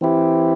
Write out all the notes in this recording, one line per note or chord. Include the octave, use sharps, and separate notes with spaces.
E3 C4 E4 G4